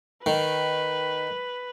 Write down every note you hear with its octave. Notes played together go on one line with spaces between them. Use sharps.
D#3 B4